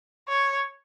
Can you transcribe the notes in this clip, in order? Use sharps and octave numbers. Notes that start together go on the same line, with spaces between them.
C#5